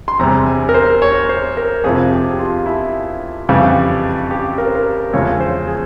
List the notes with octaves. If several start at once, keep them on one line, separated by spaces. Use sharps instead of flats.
C6
E2 C3 G3 A#5
G#5
A#4
C5
C#5
C5
A#4
F2 C3 F3 G#4
G4
F4
E4
F2 C#3 E3 G3
G4
A#4
C5
A#4
E2 C#3 F3 G#3 C#5
C5
G#4